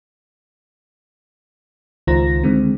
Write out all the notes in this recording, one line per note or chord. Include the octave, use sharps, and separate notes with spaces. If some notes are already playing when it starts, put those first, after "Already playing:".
C#2 D#3 F4 C5 A#5 A#6
D3 D#3 G#3 C4